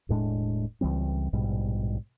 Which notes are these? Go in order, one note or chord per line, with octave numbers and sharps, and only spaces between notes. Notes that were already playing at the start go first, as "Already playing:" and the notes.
E1 A2 G#3 D4
C#2 E3 G3 C4
A#1 G#2 B2 G3